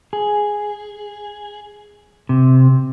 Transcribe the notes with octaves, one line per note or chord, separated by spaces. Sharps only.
G#4
C3